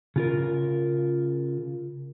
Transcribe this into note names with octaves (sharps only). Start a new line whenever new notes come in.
C#3 F4 A#4